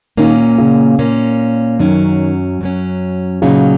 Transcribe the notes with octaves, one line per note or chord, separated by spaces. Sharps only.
A#2 D#3 A#3 C#4
C#3
A#2 A#3 C#4
F#2 D#3 F#3 C#4
F#2 F#3 C#4
A#2 C#3 F#3 D#4